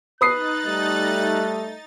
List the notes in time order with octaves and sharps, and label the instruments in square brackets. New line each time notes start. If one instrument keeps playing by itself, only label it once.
[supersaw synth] D#4 A6 [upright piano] B4 D#6 C7 [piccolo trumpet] F#6
[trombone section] G3 A3